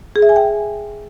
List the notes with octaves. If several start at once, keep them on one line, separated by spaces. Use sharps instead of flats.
G#4
E5
G#5
G5